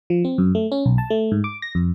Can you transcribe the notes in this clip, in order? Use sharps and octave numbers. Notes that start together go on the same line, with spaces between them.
F3
C4
F#2
A3
C#4
B1
A5
A3
G#2
D6
A#6
F2